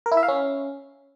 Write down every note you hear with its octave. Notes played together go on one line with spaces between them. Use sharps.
A#4
E4
E5
F5
C#4